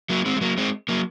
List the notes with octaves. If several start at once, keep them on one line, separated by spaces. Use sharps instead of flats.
F#3 A#3
G#3 C4
G#3
F#3 A#3
G#3 C4
F#3 A#3